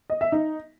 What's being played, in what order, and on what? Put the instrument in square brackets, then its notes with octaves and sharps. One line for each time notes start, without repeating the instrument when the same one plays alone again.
[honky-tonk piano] D#5
E5
D#4